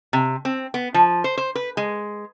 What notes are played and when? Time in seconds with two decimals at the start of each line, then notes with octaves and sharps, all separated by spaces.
0.13 C3
0.45 C4
0.74 B3
0.94 F3
1.24 C5
1.37 C5
1.55 B4
1.77 G#3